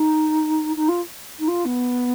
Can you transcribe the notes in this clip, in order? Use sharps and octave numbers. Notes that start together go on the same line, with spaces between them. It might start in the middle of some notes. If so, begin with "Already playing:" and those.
Already playing: D#4
D#4
F4
D#4
F4
B3